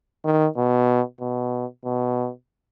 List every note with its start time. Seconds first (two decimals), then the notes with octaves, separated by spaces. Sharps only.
0.25 D#3
0.57 B2
1.21 B2
1.85 B2